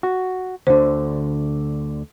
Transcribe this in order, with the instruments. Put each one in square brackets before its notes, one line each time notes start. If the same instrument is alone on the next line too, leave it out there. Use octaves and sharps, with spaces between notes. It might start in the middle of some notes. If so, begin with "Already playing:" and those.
[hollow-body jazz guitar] F#4
[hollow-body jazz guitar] D2 D3 [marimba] C5